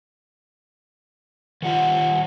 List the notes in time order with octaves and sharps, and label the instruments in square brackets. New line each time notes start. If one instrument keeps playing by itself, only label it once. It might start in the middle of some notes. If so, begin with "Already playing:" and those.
[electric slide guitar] D#3 G3 F4 [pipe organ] F#5